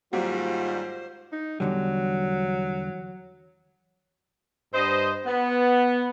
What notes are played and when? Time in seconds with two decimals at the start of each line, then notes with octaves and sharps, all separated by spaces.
0.13 G#2 D#3 F#3 G3 A#3 F4 F#4 C5
1.32 D#4
1.60 E2 D3 F#3 G3
4.74 G2 C5 D#5
5.26 B3